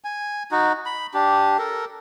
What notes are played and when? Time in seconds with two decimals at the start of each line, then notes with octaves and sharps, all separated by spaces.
0.04 G#5
0.51 D#4 F#4
0.86 B5
1.14 D4 G4
1.59 A4 A#4